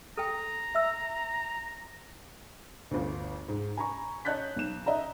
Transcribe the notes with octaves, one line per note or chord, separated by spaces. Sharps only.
A4 G5 A#5
E5 E6
G1 D2
G#2
G#5 A#5 B5 C#6
C#5 D#5 A5 F#6 G6 B6
B1 E7
D#5 E5 A#5